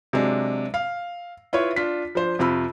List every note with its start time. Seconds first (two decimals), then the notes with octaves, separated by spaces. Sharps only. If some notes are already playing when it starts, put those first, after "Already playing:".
0.13 C3 F#3 G#3 D4
0.74 F5
1.53 E4 F4 B4 C#5
1.76 D4 F4 B6
2.15 F3 D4 C5
2.39 F2 C3 F4 B5 E6